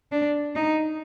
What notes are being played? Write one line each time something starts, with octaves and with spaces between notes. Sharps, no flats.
D4
D#4